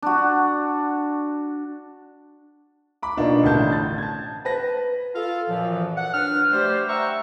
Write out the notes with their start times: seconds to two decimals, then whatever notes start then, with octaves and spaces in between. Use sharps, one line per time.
0.02 D4 F#4
3.02 B5 D6
3.17 B2 A#3 D4 D#4 F4
3.43 A1 A2 D3 A5 G6
3.72 A6
3.98 A5 G#6
4.45 B4 A5 A#6
5.15 F4 A4 F5
5.49 F#2 A#2 E3 F3
5.97 F#5
6.14 F#3 D4 B4 F6
6.52 G3 A3 G4 C5
6.89 E5 F#5 G5 A#5 C#6 E6